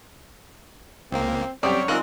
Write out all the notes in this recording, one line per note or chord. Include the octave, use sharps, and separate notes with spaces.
C#2 A#3 C4
F#2 G3 C4 G4 C#5 D5 D#6
D#3 G#3 C4 F4 A#4 E6 F#6